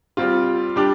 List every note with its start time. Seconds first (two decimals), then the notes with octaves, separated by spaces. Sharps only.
0.17 G3 C4 F4
0.76 G3 D4 G4